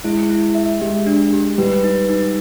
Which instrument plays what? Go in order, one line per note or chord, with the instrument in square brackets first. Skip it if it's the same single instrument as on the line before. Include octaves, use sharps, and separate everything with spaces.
[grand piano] G#3 [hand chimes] E4
[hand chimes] E4
E5
[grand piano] G#3 [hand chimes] G4
[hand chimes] D4
G4
[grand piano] G3 [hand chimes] B4
[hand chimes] D#4
D#4